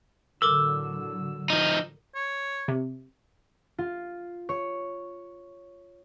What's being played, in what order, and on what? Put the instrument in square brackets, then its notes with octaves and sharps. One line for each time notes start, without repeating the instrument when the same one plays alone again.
[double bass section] A2 D3 F#3 [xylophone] A4 A#4 D6 [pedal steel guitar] E6
[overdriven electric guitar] F3 D#4
[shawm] C#5
[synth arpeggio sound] C3
[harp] F4
C#5